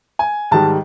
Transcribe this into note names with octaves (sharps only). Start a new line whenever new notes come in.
G#5
G#2 D#3 G3 A5